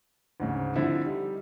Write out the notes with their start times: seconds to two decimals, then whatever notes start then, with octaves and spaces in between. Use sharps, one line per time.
0.40 D2 G#2 C#3
0.75 D3 F3 C4 E4 A4
1.05 G3 D#4